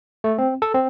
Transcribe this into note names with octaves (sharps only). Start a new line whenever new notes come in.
A3
C4
A4
C4